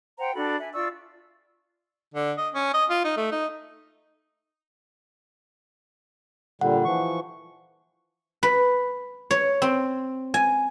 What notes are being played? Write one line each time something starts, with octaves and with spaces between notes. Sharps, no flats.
C5 F#5 G5 A#5
D4 F#4 A4 B5
E5 G#5
F4 D5 C#6 E6
D3
D#5
C#4
D#5
F4
D#4
A3
D#4
A#2 D3 G3 F#5
E3 F3 C#6
B4
C#5
C4
G#5